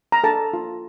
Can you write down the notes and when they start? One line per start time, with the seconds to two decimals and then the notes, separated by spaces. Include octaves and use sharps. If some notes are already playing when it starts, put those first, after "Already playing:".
0.12 A#5
0.24 A4 A5
0.53 F4